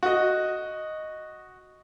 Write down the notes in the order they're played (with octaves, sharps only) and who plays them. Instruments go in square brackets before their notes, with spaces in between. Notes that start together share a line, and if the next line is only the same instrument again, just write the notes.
[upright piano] F#4 D#5